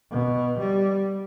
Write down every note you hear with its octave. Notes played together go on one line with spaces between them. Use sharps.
B2
G3